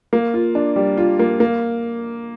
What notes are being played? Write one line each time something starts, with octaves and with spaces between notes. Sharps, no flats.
A#3
F4
D4
G3
F4
A#3
A#3